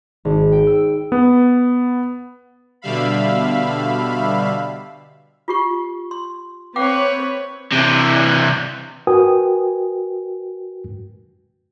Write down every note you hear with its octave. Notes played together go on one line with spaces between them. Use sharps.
G#1
G5
E6
B3
B2 D3 G3 E5 F5 B5
F4 G4 C#6
C6
C4 B4 C#5 F5 G5 D6
C3 E3
F#4 A#4 B4 G5 G#5 D#6